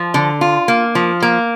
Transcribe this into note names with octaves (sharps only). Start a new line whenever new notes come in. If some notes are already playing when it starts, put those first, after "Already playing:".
Already playing: F3
D3
F4
A#3
F3
A#3